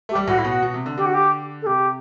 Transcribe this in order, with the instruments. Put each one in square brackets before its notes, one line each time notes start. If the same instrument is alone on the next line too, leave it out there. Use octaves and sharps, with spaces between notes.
[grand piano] A3 [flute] G4
[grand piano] G3
[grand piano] A2 [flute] F#4
[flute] E4
[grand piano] B2 [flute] F#4
[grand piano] B2
C3
D3
[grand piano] D3 [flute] G4
[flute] F#4
G4
A4
[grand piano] C3 [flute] G4